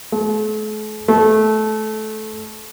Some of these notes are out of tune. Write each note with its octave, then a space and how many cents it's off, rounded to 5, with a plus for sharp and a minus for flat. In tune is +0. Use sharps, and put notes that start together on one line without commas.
A3 -45
A3 -20